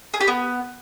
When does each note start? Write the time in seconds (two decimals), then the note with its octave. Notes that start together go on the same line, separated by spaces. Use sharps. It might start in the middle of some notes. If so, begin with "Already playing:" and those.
0.14 G#4
0.21 G4
0.28 B3